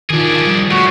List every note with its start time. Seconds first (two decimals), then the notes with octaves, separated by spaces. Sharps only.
0.10 D#3 D4 F4 G#4
0.41 F3 G3
0.71 C#3 A3 F#4